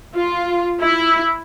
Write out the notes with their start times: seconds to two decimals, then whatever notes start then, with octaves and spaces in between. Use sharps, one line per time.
0.14 F4
0.81 E4